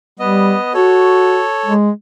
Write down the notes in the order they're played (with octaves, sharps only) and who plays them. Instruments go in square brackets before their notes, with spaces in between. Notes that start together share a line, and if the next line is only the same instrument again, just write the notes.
[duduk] G3 [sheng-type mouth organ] B3 D#5
[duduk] F#4 [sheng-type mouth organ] A4 C#5
[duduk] G#3